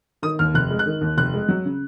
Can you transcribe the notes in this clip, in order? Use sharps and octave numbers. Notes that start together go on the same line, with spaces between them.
D#3 D#6
D#2 F6
F1 F#6
G#3
F#6
D#3
D#2
F1 F#6
G#3
F#3
C#3